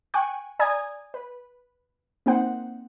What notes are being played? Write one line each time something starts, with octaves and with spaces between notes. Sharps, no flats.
G5 G#5 C#6 F#6
D5 G#5 A#5 D#6 G#6
B4
A#3 C4 D#4 C5 F#5